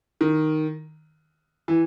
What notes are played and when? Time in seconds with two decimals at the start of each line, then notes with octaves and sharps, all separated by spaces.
0.21 D#3
1.68 E3